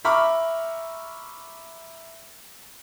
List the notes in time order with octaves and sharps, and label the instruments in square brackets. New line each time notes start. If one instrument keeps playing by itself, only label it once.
[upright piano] E5 A#5 B5 C#6 D6 F6